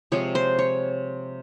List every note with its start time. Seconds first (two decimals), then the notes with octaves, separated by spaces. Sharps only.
0.12 C3 F3 G#3 C#5
0.35 C5
0.59 C#5